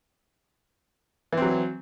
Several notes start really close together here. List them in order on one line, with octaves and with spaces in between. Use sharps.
E3 C4 F#3